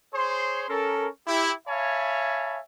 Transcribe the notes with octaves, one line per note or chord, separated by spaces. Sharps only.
G#4 C5 C#5 C6
C#4 A4 A#4
E4 G4
C#5 E5 F5 G#5 A5 B5